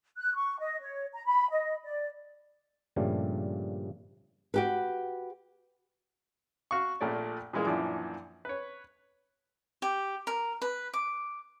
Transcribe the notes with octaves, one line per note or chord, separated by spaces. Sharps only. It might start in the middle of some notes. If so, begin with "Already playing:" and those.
F#6
C#6
D#5
C#5
A#5
B5
D#5
D5
G2 A#2 C#3 F3 G3 A3
F#4 G4 B4
F#4 F5 C#6
A#1 A#2 A3 C#5 D5
A#2 E3 G#3 A#3 G#4
F#2 A#2 E3 F3 D4
B4 C#5
G4
A#4
B4
D6